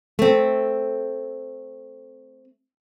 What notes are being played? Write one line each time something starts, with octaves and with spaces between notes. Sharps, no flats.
A3 C4